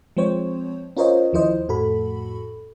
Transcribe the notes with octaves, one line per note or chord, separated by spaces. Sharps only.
F3 G#3 C4 C5 C#5
C#4 F4 A#4 C5 C#5 D#5
D#2 F3 E4 C5 D#5
F2 A2 F#4 A4 B5